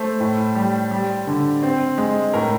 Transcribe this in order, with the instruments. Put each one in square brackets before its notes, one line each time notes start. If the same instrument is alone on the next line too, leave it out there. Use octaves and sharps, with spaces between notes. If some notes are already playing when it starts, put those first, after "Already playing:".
Already playing: [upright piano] A3 C5
A2
G3
G3
D3
C4
G#3
A2 A#4